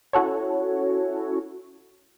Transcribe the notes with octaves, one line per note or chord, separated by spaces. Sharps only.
C#4 E4 F#4 A4 C#5